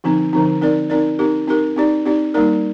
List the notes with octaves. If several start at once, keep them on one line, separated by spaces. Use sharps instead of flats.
D3 F3 C4 D#4
D3 F3 C4 D#4
C4 D#4 A#4 D5
C4 D#4 A#4 D5
C4 D#4 G4 A#4
C4 D#4 G4 A#4
C4 D#4 G4 D5
C4 D#4 G4 D5
G3 A#3 D#4 A#4 D5